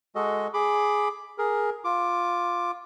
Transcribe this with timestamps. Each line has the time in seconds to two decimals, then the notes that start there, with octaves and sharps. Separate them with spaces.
0.15 G#3 F#4 A4 D#5
0.54 G#4 B5 D6
1.38 G#4 A#4
1.84 F4 D6